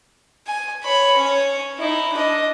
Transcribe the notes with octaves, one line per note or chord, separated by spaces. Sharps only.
G#5
C#5 B5
C#4 C#5
D#4 E4
D4 D#5